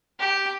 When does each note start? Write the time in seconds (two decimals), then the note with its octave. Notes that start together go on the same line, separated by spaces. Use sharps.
0.20 G4